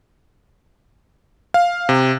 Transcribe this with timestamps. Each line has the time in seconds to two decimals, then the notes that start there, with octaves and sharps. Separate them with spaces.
1.54 F5
1.89 C3